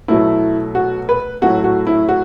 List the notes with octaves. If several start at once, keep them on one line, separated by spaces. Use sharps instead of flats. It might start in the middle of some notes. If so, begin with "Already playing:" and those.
B2 F#3 A3 E4
F#4
B4
A2 F#3 A3 F#4
F#4
E4
F#4